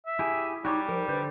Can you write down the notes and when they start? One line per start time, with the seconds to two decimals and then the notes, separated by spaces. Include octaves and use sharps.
0.06 E5
0.19 E4 G4 G#4 G#5
0.65 G3 D#4 F#4 C#5 D6
0.89 F3 A#4
1.08 D3 B4 C5 G6